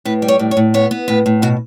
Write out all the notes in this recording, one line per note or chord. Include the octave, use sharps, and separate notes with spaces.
A2 B4
G3
C#5
A2
C#5
A2
B3 C#5
B3
A2 B4
A2
B2 F#4